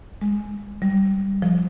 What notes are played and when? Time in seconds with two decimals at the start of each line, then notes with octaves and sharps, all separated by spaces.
0.21 G#3
0.82 G3
1.42 F3